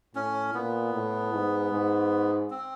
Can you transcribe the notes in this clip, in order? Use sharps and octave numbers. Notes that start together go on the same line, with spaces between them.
A2 C#4
A#2 B3
A2
G#2
G#2
C4